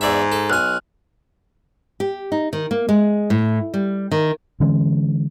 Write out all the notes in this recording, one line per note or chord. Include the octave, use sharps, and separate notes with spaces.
E2 G#2 D5 E5
A4
B1 G#5 F6 F#6
G4
D#4
D#3
A#3
G#3
A2
G3
D#3
D3 E3 G#3 C#4